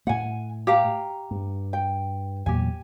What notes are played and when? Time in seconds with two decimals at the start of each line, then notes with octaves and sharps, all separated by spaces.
0.07 A2 A3 F#5 G#5
0.67 G4 F5 A#5
1.31 G2
1.73 G5
2.46 E2 A#2 F#3 G4 G#5